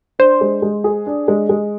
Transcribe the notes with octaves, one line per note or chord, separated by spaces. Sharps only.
D4 C5
G#3
G#3
G#4
D4
G#3
G#3